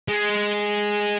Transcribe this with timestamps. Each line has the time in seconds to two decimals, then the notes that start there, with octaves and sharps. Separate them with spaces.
0.08 G#3